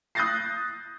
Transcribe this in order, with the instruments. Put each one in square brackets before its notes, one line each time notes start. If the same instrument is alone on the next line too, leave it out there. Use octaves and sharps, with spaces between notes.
[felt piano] D#6 F#6 G6 A6 A#6 C7